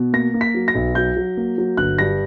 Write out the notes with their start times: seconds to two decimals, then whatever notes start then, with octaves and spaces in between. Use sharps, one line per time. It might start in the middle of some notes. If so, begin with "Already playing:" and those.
Already playing: B2
0.13 A#3 A#6
0.34 A#3
0.41 B6
0.54 F#3
0.68 A#6
0.75 B1
0.95 F#3 G6
1.17 F#3
1.37 A#3
1.58 F#3
1.77 G1 F#6
1.98 G2 A#6